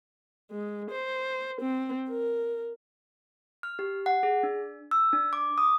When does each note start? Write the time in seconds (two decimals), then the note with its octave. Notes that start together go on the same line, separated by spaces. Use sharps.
0.51 G#3
0.91 C5
1.61 C4
2.10 A#4
3.63 F6
3.79 G4
4.06 F#5
4.23 G#4
4.43 D4
4.91 E6
5.13 D4
5.33 D6
5.58 D#6